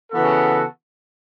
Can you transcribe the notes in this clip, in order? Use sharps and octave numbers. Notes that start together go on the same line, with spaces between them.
C#3 E3 B3 F#4 A4